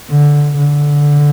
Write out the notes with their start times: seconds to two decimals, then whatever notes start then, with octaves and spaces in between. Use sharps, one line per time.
0.11 D3
0.57 D3